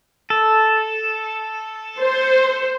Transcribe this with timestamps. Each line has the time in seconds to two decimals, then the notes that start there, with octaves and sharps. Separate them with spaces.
0.30 A4
2.00 C5